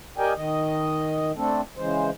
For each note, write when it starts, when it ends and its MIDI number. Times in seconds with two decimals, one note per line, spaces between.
0.18 0.33 67
0.18 0.33 70
0.18 0.33 74
0.18 0.33 75
0.18 0.33 79
0.18 0.33 80
0.36 1.32 51
0.36 1.32 75
1.37 1.61 57
1.37 1.61 60
1.37 1.61 62
1.37 1.61 69
1.77 2.10 49
1.77 2.10 52
1.77 2.10 56
1.77 2.10 72